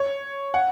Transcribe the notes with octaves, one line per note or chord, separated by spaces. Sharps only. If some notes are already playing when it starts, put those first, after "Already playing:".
Already playing: C#5
F#5